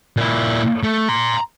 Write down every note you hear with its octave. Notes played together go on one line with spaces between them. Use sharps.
A#2 E4
A3
A#5 C6